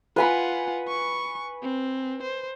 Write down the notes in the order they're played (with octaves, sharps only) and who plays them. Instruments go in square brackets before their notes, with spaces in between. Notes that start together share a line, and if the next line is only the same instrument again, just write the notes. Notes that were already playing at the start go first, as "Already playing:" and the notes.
[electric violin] F4 F#5 [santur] B4 G#5 B5
[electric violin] C#6
C4
C5